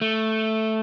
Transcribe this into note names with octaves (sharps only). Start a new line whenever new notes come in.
A3